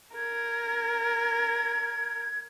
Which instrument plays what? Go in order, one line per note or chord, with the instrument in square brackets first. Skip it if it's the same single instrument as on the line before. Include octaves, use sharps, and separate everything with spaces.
[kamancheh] A#4 [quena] G#6